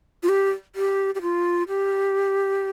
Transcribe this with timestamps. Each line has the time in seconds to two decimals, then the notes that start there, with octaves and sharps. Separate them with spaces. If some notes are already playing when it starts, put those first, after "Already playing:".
0.23 F4
0.29 G4
0.76 G4
1.15 G4
1.22 F4
1.68 G4